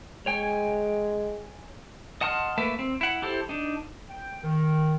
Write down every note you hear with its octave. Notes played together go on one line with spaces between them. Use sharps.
G#3 C#5 G5 G#5
D#5 F#5 A5 C6 F6
A3 A#3 B4 E5
C4
E4 F#5
E4 G4 A4 C5
D4 D#4
G5
D#3